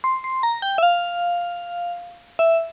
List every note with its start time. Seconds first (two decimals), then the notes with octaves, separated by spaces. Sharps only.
0.04 C6
0.24 C6
0.43 A#5
0.62 G5
0.78 E5
0.83 F5
2.39 E5